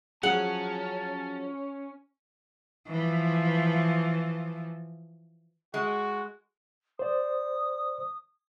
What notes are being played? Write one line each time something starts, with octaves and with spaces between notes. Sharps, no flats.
F3 F#3 C#4 G#4 F#5 A5
E3 F3
G#3 F#4
C5 D5 D#6